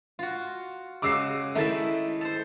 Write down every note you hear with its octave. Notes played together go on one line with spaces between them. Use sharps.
F4 F#4
C#3 G#3 F#4 D6 E6 C7
D#3 A3 E4 E5 A6
A4 C5